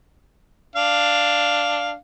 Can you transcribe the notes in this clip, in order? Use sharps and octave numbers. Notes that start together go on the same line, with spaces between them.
D4 F5